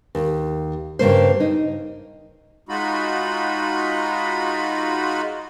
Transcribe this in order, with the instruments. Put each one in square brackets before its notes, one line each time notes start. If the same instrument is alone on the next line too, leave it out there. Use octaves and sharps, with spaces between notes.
[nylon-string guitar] D#2
G2 C#3 A#3 C5
D#4
[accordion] G#3 D#4 F4 F#4 B5